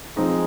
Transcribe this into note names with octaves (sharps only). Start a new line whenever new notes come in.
F3 G#3 C4 D#4